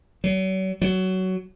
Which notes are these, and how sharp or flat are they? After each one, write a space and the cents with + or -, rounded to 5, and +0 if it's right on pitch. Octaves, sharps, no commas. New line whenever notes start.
F#3 +40
F#3 +15